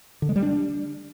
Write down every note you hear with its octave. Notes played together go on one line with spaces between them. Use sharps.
D3
G#3
G3
D4